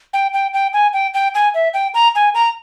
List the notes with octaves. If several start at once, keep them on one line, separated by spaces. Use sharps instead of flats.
G5
G5
G5
G#5
G5
G5
G#5
E5
G5
A#5
G#5
A#5